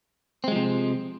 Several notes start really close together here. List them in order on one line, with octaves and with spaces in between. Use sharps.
C4 G#3 F3 C3